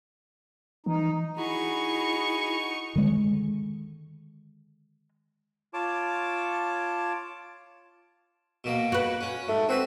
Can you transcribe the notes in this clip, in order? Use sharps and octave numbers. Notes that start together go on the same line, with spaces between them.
E3 D#4
D#4 E4 F#4 G#4 B5 C#6
D3 D#3 G#3
F4 C#5 A5 D6
B2 A#3
F#4 B4
C#4
G#2 A3
C4 F#4 B4